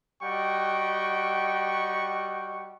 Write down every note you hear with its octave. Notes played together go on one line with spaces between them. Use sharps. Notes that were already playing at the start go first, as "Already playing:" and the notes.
G3 F#4 D#5 F#5 G5 C#6